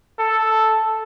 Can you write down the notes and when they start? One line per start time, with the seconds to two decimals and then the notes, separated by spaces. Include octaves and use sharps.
0.19 A4